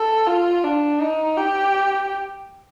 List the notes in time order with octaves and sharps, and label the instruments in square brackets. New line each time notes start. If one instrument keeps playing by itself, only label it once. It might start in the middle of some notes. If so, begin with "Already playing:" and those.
Already playing: [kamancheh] A4
F4
D4
D#4
G4